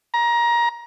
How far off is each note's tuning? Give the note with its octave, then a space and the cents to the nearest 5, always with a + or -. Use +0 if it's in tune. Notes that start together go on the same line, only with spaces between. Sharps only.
A#5 +20